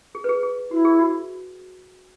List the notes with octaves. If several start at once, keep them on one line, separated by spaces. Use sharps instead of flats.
G#4
B4
G#4
G#4
E4 F#4
G#4
F#4